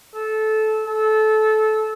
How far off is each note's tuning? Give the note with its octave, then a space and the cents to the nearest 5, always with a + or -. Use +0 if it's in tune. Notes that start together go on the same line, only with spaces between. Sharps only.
A4 -15
A4 -20